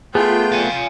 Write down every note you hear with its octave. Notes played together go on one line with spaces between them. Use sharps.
A3 B3 F4 G#4 G5
F5 G#5